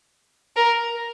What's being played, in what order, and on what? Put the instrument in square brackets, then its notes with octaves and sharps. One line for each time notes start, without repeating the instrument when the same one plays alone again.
[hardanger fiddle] A#4